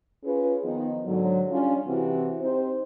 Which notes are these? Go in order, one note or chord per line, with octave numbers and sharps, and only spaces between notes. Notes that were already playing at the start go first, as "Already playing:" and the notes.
C#4 F4 G#4 B4
D#3 F3 B3 D#4
G#2 D3 F#3
G3 C#4 D4 F4
C3 E3 C4 F#4 G4
C4 D#4 G4 C5